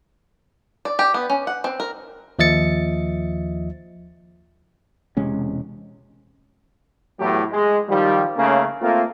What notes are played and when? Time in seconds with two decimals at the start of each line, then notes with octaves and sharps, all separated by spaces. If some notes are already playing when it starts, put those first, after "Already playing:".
0.85 D5
0.99 G4
1.14 B3
1.30 C#4
1.47 F#5
1.64 C4
1.80 A#4
2.39 D#2 F3 D#5 E5 A6 C#7
5.17 E1 C3 G#3 C#4
7.18 E2 A2 F#3 A3 G4
7.51 G#3
7.89 D#3 F3 G3
8.37 C#3 A3 A#3 C#4
8.81 A3 A#3 C4 F4